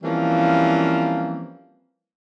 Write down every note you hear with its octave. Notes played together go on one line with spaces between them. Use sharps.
E3 F3 G3 A#3 C4 C#4